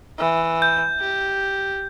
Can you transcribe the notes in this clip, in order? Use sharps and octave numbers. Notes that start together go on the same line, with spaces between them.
E3
G6
G4